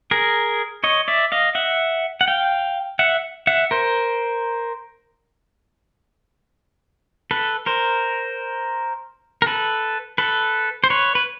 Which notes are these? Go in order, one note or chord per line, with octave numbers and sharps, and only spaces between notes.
G#4 A#4
C#5 D#5
D5 E5
D#5 F5
E5 F#5
F#5
F5 G5
E5 F#5
E5 F#5
A#4 C5
A4 B4
A#4 C5
A#4
A4 B4
A4 B4
C5
B4 C#5
B4